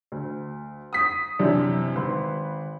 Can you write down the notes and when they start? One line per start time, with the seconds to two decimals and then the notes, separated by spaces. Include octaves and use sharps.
0.12 D2
0.93 D#6 B6
1.39 F#2 C3 E3 C4 D4
1.95 G#1 B4 C6